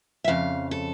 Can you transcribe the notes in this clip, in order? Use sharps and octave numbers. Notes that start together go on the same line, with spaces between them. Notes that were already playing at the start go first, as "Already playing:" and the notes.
E5
F2 C#3 F5
A4